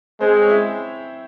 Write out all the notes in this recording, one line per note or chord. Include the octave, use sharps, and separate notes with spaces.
G#3 C4 C5
C#5
E4 E5